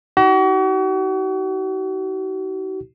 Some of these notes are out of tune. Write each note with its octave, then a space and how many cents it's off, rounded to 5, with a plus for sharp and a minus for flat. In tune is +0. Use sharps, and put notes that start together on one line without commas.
D#4 +30 F#4 +40